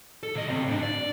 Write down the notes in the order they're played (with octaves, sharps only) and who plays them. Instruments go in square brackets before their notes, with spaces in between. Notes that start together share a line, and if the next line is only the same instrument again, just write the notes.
[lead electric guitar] A4
C2 D#5
C#3 C4
A2 D4
D5